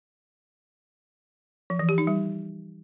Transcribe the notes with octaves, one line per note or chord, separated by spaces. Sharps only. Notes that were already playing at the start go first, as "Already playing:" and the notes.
F3
E3
G4
D#4
G3